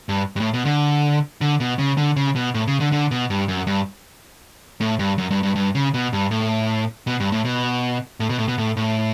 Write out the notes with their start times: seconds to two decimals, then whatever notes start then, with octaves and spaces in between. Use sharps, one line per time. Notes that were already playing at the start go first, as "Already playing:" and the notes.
0.09 G2
0.36 G2
0.40 A2
0.54 B2
0.65 D3
1.41 D3
1.60 B2
1.79 C#3
1.97 D3
2.16 C#3
2.36 B2
2.54 A2
2.67 C#3
2.80 D3
2.92 D3
3.11 B2
3.30 G2
3.48 F#2
3.67 G2
4.80 A2
4.99 G2
5.18 F#2
5.31 G2
5.43 G2
5.56 G2
5.75 C#3
5.94 B2
6.13 G2
6.31 A2
7.07 B2
7.20 G2
7.32 A2
7.45 B2
8.20 A2
8.29 B2
8.38 A2
8.48 B2
8.58 A2
8.77 A2